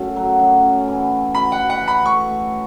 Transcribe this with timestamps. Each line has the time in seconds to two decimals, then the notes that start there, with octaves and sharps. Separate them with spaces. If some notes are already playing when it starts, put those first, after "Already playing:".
Already playing: F#2 A3
0.16 F#3
0.40 F#2
0.63 C#4
0.88 E3
1.11 C#4
1.34 F#4 B5
1.52 F#5
1.58 F#4
1.70 F#5
1.82 E3
1.88 B5
2.06 A3 C#6
2.29 A3